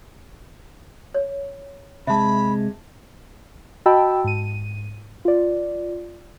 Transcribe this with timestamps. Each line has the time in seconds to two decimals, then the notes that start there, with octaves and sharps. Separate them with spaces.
1.14 C#5
2.07 C3 G#3 E5 A5 B5
3.86 F#4 D#5 G5 A5 B5 E6
4.24 G#2 D#7
5.25 F4 D5